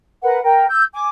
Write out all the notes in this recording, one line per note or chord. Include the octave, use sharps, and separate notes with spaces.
A#4 B4 F#5
A#4 G5
E6 G6
G#5 D6